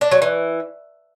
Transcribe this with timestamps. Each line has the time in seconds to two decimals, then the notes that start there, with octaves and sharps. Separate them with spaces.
0.01 D4
0.11 F#3
0.22 E3